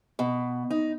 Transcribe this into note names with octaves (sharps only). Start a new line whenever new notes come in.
B2
D#4